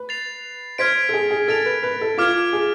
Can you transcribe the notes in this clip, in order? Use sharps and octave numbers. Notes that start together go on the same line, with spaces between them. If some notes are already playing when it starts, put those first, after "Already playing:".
Already playing: B4
A6 C7 F7
C5 F6 G#6 B6 D7
A4
G#4
G#4
A4 A6 D7 F7
B4
B4
A4
F4 D6 F6 G#6
G#4